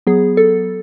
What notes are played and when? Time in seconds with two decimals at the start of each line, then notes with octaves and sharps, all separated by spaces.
0.07 F#3 B3 G#4
0.37 A4